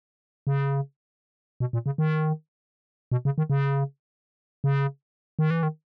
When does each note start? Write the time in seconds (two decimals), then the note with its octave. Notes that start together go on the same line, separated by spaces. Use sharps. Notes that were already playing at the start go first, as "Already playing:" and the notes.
0.47 C#3
1.60 B2
1.73 A#2
1.86 C#3
1.98 D#3
3.12 B2
3.25 C#3
3.38 D#3
3.50 C#3
4.64 C#3
5.39 D#3
5.51 E3
5.63 D#3